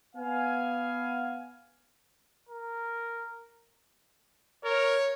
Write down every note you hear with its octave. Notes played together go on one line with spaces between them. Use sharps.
B3 F5 G#5
A#4
A#4 C#5